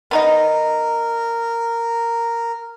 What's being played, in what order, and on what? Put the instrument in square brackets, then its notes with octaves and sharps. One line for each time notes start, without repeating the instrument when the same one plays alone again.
[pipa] B3 D#4 D#5 [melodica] A#4